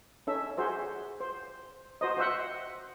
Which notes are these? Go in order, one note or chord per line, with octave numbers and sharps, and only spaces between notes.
C#4 D#4 A4 E5
F#4 G#4 C5 E5
C5
F#4 C5 D#5
F#4 C5 E5 F#5